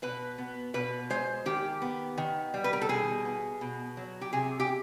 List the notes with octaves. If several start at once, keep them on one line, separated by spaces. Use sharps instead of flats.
B2 B4
B3
B2 B4
G#3 C5
D#3 G4
B3
D#3
G3
B4
A#4
A4
B2 G#4
B3
B2
F#3
G4
C3 G#4
G4